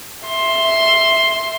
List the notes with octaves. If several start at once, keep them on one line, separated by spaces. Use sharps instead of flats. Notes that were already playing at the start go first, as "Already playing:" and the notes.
E5 C6